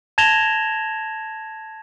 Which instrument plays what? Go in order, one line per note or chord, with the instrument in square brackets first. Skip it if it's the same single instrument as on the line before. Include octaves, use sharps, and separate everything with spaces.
[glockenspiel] A5 G#6 A#6 E7 F7 G7